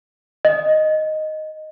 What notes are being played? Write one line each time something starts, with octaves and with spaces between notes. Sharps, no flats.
D#5